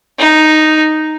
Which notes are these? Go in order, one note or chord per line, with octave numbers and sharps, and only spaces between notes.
D#4